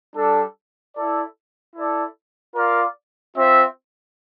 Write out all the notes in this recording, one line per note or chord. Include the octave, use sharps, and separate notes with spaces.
G3 D4 A4
E4 A4 D5
E4 A4 D5
F4 A#4 D5 F5
C4 F4 C5 E5